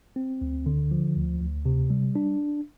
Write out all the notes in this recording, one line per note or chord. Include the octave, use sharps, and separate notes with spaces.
C4
D2
D3
F3
D2
D2
C3
G3
D4